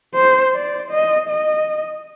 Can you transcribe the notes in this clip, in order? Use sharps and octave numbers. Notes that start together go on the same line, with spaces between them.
C5
D5
D#5
D#5